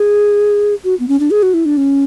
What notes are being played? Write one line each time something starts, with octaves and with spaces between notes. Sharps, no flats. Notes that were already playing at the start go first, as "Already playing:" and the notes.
Already playing: G#4
F#4
B3
C#4
D4
G#4
F#4
E4
D4
C#4